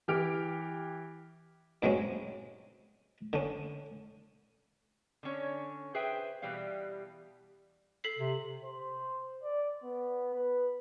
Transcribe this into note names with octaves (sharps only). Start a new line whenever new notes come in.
E3 G4 F6 D7
G2 F#3 G#3 C4 C#4
D3 C#4
D3 C#4 C#5
G#4 B4 C5 E5 G5
B2 E3 G3 G4 F5
A4 B6 C7
C3
C5
D5
B3
B4